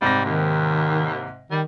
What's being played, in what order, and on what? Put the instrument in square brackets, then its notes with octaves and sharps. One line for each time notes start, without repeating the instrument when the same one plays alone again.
[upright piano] G#2 C3 A#6 [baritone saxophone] G3
[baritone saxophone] D#2 [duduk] D#3
[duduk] D#3 [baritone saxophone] G3